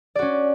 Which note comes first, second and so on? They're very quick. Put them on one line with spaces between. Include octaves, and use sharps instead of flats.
D5 F#4 C#4